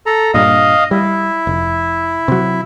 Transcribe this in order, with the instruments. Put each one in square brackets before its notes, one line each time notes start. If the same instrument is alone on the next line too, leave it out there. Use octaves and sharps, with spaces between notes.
[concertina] A4 A#5
[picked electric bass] G2 A#2 [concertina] D#5 F5
[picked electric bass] G3 [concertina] E4
[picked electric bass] F1
C3 F#3